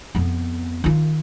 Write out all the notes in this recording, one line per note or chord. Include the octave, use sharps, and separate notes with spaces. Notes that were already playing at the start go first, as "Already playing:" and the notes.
F2 B3
D#3 F4